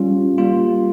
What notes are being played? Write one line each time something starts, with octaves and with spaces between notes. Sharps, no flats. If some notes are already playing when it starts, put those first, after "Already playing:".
Already playing: G3 C#4 F4
G3 A#3 F4